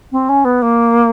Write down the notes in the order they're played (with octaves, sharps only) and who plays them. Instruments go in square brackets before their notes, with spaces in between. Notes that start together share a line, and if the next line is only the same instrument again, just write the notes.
[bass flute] C4
C#4
B3
A#3